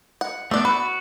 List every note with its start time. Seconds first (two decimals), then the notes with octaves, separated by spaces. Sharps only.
0.21 F#5
0.51 A3 B3 D4 D5
0.65 F#4 B4